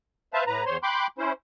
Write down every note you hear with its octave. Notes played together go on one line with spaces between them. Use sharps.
B4 C5 E5 F5 A5
A2 B4 A#5
E2 C5 C#5 C6
G5 B5 C6 D6 F#6 G6
C#4 E4 C5